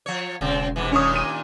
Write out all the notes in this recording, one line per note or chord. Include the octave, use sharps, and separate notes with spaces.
F3 C#5
E1 C#3 C4
G#2 C3 E3
D#2 A#2 C#4 D4 C#5 D#6
D#7